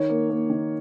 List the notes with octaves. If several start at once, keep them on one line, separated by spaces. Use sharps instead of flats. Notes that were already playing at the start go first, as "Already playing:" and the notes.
Already playing: D#3 C#5
A#3
A#3
D#3